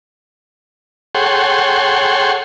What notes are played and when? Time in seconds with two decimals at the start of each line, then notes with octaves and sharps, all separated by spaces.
1.15 G#4 A4 C#5 F#5 G5 C6